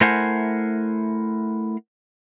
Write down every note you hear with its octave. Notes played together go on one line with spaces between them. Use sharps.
A3 E4 A#4 C5 F#5 G#5